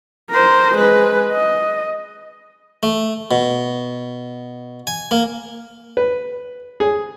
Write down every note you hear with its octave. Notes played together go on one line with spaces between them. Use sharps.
A#4 C5
G#3 B4
D#5
A3
B2
G#5
A#3
B4
G#4